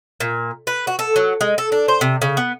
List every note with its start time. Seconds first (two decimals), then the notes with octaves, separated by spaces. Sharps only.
0.20 A#2
0.67 B4
0.87 F#4
0.99 A4
1.16 F#3
1.41 G#3
1.58 A4
1.72 D4
1.88 C5
2.01 C3
2.22 C#3
2.37 B3